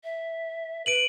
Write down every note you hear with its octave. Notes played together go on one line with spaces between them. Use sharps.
E5
B4 D7 D#7 F#7